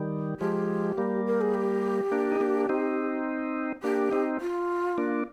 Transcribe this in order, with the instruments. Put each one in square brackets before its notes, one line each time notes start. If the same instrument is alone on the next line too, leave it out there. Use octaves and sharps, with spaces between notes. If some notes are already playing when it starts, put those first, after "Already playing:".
Already playing: [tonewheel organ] D#3 G3
[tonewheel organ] F3 G#3 [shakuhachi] G4
[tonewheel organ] G3 A#3
[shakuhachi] A#4
G#4
G4
[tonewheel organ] A#3 D4
D#4
A#3 D4
C4 D#4
[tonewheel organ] A#3 D4 [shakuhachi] G4
[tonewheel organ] C4 D#4
[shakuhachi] F4
[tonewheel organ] A#3 D4